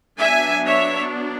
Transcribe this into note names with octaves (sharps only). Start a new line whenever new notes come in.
F#3 B3 D4 E5 G#5
C#5 E5